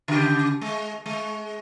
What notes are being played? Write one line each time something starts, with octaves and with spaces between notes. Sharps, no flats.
C#3 G4
G#3
G#3